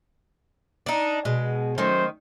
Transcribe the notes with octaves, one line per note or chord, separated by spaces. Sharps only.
D4 D#4
B2 G#3
D#3 F#3 A3 C#4 C5